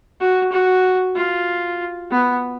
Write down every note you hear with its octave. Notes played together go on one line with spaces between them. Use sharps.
F#4
F#4
F4
B3